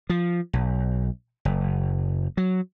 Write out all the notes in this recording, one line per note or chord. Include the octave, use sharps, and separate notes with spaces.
F3
B1
F#1
F#3